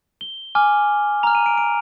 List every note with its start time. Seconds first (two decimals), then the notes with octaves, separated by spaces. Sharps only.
0.21 G7
0.55 G#5 D6 F6
1.23 A#5 F6 F7
1.35 D#7
1.46 D7
1.58 D7